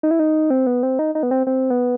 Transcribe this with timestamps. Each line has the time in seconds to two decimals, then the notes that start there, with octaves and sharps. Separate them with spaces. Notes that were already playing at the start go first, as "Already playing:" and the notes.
0.03 D#4
0.11 E4
0.19 D#4
0.50 C4
0.66 B3
0.83 C4
0.99 D#4
1.15 D#4
1.23 B3
1.31 C4
1.47 C4
1.70 B3